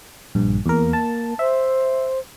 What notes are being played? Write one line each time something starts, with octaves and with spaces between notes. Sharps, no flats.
A#1 G2
E2 A#3 A#4
A5
C5 E5